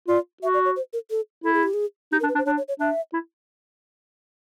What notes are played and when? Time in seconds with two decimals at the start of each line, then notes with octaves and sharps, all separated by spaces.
0.08 F4 D5
0.43 F#4 E5
0.54 D5
0.65 C#5
0.76 C5
0.93 A#4
1.10 A4
1.44 E4 A4
1.54 G#4
1.63 G4
1.74 G#4
2.12 D#4 G4
2.20 A#4
2.23 D4
2.29 B4
2.35 D4
2.38 C5
2.46 D4 C#5
2.57 C#5
2.68 C#5
2.80 D4 E5
3.13 E4